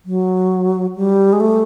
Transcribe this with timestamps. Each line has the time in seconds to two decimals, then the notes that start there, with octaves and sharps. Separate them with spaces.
0.05 F#3
0.96 G3
1.32 G#3
1.40 A3